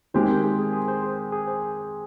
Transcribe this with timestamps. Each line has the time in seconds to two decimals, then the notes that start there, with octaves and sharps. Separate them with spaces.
0.14 D#3 G#3 C4 G4 C5
0.28 A#4
0.44 G#4
0.58 G#4
0.73 G#4
0.88 C5
1.03 G#4
1.32 G#4
1.47 C5